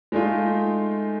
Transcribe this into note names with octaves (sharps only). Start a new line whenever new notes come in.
G#3 A3 D#4 F4